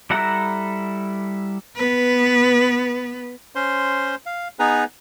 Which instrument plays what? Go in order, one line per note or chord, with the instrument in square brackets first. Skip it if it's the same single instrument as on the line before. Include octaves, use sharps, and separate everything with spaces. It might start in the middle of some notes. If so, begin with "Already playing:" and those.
[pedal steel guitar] G3 E4 A4 F#5 A#5
[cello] B3 B4
[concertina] C#4 C5 C6
F5
B3 D#4 G#4 B4 G#5 A#5